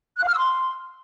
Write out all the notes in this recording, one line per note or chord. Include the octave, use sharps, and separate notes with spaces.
F#6
F5
F6
E6
C6